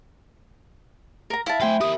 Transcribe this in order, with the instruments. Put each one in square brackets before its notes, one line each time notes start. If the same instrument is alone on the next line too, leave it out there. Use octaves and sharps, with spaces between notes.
[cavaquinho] A#4 A#5
[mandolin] E4 [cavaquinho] F5 A5
[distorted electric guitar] A3 F5 [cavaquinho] C5 G5 G#5
[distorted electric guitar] G4 A#4 [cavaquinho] D#6